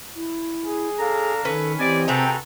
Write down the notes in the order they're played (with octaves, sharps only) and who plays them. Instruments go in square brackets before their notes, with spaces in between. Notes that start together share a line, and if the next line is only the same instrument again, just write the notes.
[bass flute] E4
[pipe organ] G#4
[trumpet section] D4 F5 A#5 [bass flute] A4
[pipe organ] D#3 [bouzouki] C#4 B4 [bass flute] A4
[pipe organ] E3 G4 [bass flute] C4 [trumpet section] D5 D#5 G#5
[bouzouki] C3 G#4 A#5 [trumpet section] F#4 A4 B4 [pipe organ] G5